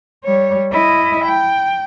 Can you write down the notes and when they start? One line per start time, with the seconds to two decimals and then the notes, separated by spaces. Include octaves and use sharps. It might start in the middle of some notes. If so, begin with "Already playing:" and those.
0.24 G3 C#5
0.72 E4 D#5
1.25 G5